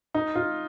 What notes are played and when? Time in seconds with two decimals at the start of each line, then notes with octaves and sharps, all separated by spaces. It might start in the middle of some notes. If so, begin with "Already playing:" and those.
0.14 D#4
0.35 F4